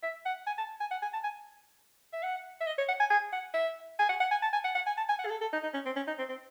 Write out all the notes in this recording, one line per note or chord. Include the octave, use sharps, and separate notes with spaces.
E5
F#5
G#5
A5
G#5
F#5
G#5
A5
G#5
E5
F#5
E5
D#5
C#5
F#5
G#5
G#5
F#5
E5
G#5
F#5
F#5
G#5
A5
G#5
F#5
F#5
G#5
A5
G#5
F#5
G#4
A4
A4
D#4
D#4
C#4
C4
C#4
D#4
C4
C4